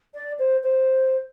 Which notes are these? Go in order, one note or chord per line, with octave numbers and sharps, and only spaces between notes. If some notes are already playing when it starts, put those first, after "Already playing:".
D5
C5
C5